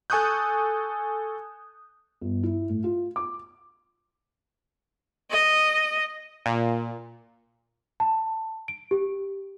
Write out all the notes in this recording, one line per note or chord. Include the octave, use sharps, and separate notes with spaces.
A4 G#5 C#6 D#6 F#6 G6
G1
E4
A2
F4
D6
D#5
A#2
A5
D7
G4